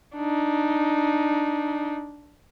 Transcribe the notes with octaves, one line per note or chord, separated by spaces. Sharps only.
D4 D#4